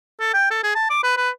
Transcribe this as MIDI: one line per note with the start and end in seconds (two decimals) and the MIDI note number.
0.20 0.29 69
0.34 0.46 79
0.51 0.62 69
0.63 0.74 68
0.75 0.86 81
0.90 1.00 86
1.03 1.15 71
1.17 1.30 71